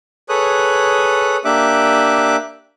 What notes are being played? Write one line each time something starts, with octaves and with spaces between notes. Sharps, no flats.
G#4 A4 B4 C#5 D#6 F#6
A#3 D4 G4 E5 D6 F#6